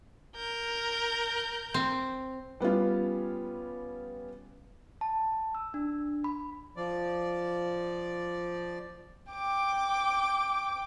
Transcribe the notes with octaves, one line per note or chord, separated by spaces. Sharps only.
A#4 G6
C4
G3 B3 C#4 F4
A5
E6
D4
B5
F3 D5
G5 D6